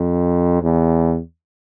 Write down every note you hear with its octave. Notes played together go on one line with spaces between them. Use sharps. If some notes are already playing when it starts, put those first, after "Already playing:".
Already playing: F2
E2